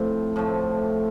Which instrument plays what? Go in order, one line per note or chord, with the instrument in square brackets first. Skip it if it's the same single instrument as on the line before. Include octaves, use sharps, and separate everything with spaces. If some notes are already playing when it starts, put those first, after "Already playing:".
Already playing: [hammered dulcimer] A2 F3 C4
A2 F3 A3